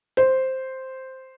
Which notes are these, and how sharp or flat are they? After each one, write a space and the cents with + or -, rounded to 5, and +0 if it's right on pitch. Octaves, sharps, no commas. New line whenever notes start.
C5 +0